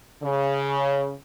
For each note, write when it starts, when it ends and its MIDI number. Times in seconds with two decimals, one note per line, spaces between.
0.23 1.15 49